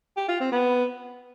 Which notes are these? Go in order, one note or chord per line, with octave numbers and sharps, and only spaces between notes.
G4
F4
C4
B3